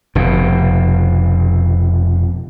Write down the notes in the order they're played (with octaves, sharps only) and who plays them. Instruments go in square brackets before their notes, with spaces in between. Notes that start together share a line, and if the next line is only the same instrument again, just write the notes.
[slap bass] F1 B2